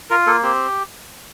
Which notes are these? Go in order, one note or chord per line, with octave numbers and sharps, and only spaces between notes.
F4 A#4
A#3 A4
C4 G4